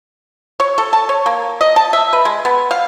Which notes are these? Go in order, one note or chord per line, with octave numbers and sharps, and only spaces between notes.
C#5
A4
A5
C#5
A#3
D#5
A5
E5
B4
G#3
B3
F5